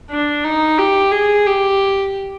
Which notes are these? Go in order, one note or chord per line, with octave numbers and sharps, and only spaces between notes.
D4
D#4
G4
G#4
G4